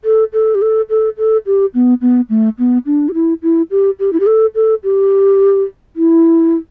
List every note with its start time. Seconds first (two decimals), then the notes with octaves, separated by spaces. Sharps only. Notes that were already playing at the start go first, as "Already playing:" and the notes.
0.05 A4
0.33 A4
0.55 G4
0.62 A4
0.90 A4
1.18 A4
1.46 G4
1.74 B3
2.01 B3
2.30 A3
2.59 B3
2.86 D4
3.09 G4
3.14 E4
3.43 E4
3.71 G4
4.00 G4
4.13 E4
4.20 G4
4.27 A4
4.55 A4
4.84 G4
5.96 E4